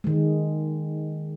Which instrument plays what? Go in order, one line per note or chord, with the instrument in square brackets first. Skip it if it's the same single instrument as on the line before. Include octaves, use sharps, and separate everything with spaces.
[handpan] D#3 G#3